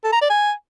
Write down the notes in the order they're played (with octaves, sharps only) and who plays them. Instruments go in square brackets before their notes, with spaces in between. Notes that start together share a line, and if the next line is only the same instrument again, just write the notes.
[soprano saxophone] A4
A#5
D5
G#5